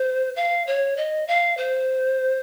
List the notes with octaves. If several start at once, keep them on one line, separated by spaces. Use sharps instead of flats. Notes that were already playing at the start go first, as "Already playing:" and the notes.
Already playing: C5
F5
C#5
D#5
F5
C5